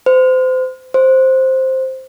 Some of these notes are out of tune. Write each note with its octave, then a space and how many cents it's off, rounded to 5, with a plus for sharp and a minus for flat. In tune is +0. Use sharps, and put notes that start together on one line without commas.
C5 -30
C5 +5